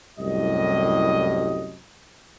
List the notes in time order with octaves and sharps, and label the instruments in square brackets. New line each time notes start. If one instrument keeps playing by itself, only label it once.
[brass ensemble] C2 F#2 A2 G3 D#5